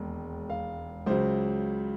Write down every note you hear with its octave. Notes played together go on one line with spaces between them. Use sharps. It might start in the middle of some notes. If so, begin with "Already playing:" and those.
Already playing: E1 D#2 G#3 B3
F5
C#2 C#3 F#3 C5